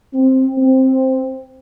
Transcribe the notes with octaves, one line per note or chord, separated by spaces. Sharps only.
C4
C4